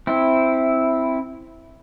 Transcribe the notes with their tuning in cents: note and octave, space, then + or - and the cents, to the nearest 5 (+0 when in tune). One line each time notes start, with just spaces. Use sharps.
C4 +0 E4 -5